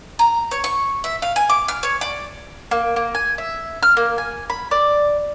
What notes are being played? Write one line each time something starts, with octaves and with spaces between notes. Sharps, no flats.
A#5
C#5
C#6
E5
F5
G#5
D6
F6
C#5
D5
A#3
A#3
G#5
E5
F6
A#3
G#5
B5
D5